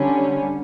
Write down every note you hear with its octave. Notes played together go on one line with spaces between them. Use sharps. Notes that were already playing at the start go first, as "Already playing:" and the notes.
Already playing: D3 G3 C#4